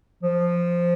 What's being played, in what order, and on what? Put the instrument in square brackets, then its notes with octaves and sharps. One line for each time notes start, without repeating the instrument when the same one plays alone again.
[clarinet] F3